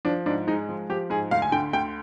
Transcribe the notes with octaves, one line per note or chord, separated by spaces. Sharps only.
F3 D4
G#2 D4
G#3 D#4
F3
F3 G4
G#2 G#4
D2 F5
G#5
D3 G5
D2 G5